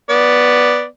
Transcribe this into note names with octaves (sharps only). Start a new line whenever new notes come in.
B3 D5